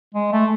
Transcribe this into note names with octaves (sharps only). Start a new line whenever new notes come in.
G#3
A3